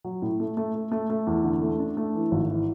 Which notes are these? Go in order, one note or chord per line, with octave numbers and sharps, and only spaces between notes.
F#3
A2
A3
A3
A3
A3
A3
E2
D3
A3
D4
A3
E3
G#1
E3